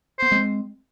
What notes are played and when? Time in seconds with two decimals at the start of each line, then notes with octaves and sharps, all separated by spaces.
0.19 B3 C5
0.32 G#3 C4